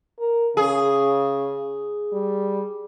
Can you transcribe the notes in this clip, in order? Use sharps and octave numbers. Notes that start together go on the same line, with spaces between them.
A#4
C#3 G#4
G3